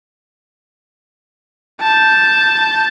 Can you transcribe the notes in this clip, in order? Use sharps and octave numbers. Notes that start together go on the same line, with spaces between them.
A5 G6